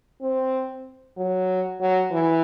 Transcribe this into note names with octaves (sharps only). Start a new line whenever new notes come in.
C4
F#3
F#3
E3